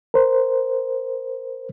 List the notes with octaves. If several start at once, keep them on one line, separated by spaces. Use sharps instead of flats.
A#4 C5